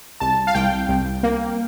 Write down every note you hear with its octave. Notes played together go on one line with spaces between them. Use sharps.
C2 A5
F5
C2 G5
C2
A#3